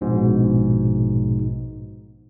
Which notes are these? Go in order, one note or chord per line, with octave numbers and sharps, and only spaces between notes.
A#1 G#2 B2